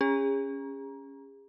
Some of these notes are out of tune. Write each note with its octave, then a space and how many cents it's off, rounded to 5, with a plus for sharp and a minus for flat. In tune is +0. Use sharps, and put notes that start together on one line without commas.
C#4 +0 G#4 -35 A#5 +20